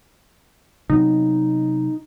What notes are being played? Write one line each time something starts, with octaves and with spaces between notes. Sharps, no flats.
C3 F#3 B3 D#4